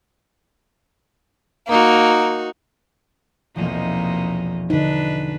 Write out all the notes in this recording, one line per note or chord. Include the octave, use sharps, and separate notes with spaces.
A#3 D#4 F#4
B1 E2 C3 F3 A#3 D#4
D3 D4 D#4 B4